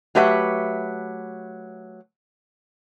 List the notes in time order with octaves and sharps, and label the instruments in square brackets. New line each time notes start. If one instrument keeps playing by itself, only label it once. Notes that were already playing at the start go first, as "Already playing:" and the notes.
[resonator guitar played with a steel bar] F#3 A3 G4 B4 E5 F#5